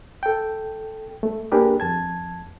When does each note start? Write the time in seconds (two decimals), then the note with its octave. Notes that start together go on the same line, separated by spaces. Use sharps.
0.23 A4 G5
1.23 A3
1.52 A#3 D4 G4 G#4 A#4 B4
1.80 F2 A5 G#6